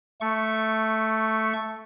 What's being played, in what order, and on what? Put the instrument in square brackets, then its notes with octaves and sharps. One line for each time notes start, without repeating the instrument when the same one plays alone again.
[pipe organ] A3 C#6